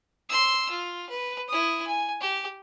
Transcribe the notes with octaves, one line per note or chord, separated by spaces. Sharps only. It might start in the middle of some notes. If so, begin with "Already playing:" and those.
C6 E6
F4
B4
E4 D#6
G#5
G4